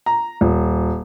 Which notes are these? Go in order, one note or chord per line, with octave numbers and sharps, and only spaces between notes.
A#5
D#1